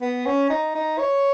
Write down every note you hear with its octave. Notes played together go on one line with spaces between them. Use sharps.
B3
C#4
D#4
D#4
C#5